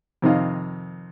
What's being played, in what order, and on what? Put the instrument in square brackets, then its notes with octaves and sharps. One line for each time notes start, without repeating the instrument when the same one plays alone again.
[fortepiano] F2 C3 D#3 D#5 F5